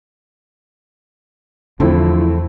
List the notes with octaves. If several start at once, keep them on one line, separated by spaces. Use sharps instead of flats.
E2 D3 F3 A3 C4 E4